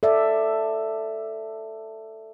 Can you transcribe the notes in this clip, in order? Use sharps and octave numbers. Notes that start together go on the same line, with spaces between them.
A4 D5 E5